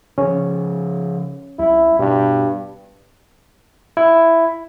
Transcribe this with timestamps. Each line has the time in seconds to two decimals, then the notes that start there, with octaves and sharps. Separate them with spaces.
0.18 C#3 F3 C#4
1.59 C2 E4
1.99 G2 B2
3.97 E4